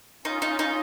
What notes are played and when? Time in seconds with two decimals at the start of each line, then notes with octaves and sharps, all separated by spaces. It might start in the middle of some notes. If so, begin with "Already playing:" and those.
0.25 C#4 D#4 F4
0.42 D#4
0.59 D#4